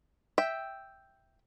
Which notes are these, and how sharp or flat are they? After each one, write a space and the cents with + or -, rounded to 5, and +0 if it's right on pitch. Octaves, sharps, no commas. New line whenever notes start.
E5 -5 G5 +0